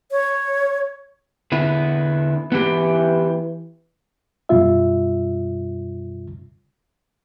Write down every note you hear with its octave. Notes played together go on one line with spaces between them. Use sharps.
C#5
D3 B3 E4
E3 B3 E4 G4
F#2 B2 G3 F4 E5